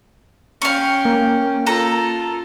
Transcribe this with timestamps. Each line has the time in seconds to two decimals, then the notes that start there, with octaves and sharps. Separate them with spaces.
0.62 C#4 F5 G5 C#6
1.05 A#3
1.67 F4 A4 A#5